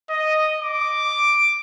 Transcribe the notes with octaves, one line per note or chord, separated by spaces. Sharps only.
D#5
D6